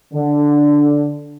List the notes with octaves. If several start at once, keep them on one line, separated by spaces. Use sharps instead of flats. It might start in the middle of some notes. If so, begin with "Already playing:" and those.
D3